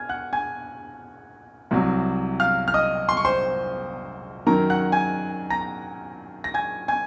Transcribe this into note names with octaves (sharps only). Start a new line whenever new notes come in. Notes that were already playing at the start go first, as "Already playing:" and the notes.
Already playing: G#5 F6 G#6
F#5 F#6
G#5 G#6
C2 C3 F#3
F5 F6
F6
D#5 D#6
C6
C#6
C5 C6
F#2 D#3 F#3 A#4 A#5
F#5 F#6
G#5 G#6
A#5 A#6
A#6
G#5 G#6
G#5 G#6